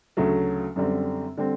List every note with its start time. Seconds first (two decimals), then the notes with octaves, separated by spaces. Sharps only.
0.17 D2 C#3 F#3 A3
0.76 F#2 D3 G3 C4
1.37 D3 G3 C4